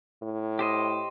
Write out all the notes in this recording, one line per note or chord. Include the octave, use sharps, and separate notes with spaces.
A2
G4 C5 D#5